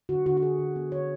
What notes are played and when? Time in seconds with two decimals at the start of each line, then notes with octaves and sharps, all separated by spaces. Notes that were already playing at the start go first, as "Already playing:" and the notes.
0.09 D3 F#4
0.26 D3 F#4
0.37 F#4
0.42 D3 G#4
0.59 D3
0.76 B3
0.92 D3 C#5